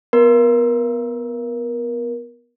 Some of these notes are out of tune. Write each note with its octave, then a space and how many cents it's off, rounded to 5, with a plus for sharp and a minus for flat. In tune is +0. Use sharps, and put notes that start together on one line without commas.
B3 +0 A#4 +20